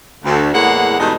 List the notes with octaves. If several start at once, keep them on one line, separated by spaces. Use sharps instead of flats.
D2
E2 A2 G#3 A#3 F#5
E2 G2 B2 G#3 A3 D#4